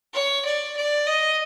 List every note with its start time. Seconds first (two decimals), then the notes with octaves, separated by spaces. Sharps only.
0.14 C#5
0.45 D5
0.77 D5
1.07 D#5